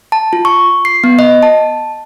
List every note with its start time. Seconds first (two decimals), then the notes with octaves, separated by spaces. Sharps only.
0.12 A5
0.33 F4
0.45 C#6
0.85 C7
1.04 B3
1.19 D#5
1.43 A5